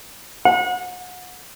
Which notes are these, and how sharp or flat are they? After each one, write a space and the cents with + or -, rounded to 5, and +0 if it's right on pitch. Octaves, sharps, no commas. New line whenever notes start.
F#5 -30